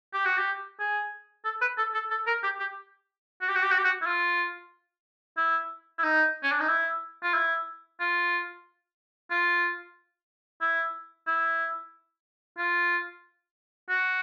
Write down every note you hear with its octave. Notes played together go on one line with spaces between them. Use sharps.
G4
F#4
G4
G#4
A4
B4
A4
A4
A4
A#4
G4
G4
F#4
G4
F#4
G4
F#4
G4
F#4
E4
F4
E4
E4
D#4
C#4
D4
D#4
E4
F4
E4
F4
F4
E4
E4
F4
F#4